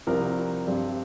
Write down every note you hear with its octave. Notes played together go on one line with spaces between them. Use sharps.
C2 C3 F3 C4 A#4
G2 G3 C4